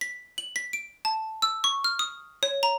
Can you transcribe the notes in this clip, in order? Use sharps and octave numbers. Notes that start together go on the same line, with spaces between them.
B6
F#7
B6
D7
A5
E6
C#6
F6
D#6
C#5
A#5